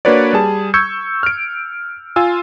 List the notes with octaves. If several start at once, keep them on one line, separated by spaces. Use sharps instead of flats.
A#3 D4 F#4 B4 C#5 D5
G3 G#4 A5
C#6 E6 G6 G#6 C#7
F6 D7
F4 G#5 E6